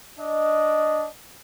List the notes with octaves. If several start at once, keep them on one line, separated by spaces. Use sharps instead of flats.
D4 D#5